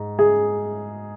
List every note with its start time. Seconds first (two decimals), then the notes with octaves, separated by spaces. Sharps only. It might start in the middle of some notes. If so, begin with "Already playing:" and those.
Already playing: G#2
0.19 G#4